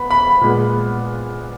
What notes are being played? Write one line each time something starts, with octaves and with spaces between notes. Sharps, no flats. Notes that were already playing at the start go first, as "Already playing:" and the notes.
Already playing: B3 B5
B5
A#2 G#3 B3